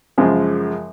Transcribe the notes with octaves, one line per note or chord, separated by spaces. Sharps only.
F#2 C#3 F3 G#3